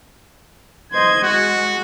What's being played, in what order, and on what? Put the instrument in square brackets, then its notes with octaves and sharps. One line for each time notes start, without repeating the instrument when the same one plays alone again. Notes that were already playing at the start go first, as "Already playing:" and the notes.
[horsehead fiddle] C5 D#5 [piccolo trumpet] G#6
[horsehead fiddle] G#3 [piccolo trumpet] F#4